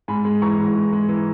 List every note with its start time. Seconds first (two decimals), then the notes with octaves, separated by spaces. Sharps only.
0.08 G#2 G#5 B5
0.25 G#3
0.42 E3 A#5 C#6
0.59 G#2
0.76 G#2
0.93 G#3
1.09 E3